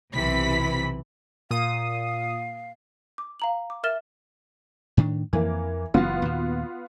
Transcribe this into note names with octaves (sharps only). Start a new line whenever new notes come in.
B1 C3 E3 B5 B6
A#2 F5 D#6 D#7
D6
F5 A#5 F#7
D6
A#4 E5 F6 A6 E7 G7
A2 D#3 D4
F2 E3 A#3
F#1 E3 B3 F4 F#4
D#2 A#2